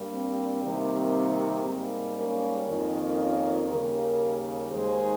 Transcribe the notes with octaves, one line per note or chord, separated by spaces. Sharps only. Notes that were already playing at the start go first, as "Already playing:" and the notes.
Already playing: G2 G3 A#3
C4
C3 D#3 G3 A#3
C4
G#2 G3 A#3
A#3 C#4
F2 D#3 A#3
C#4 F4
D#2 C#3 G3 A#3 G4 A#4
D#2 D#3 G#3 G#4 C5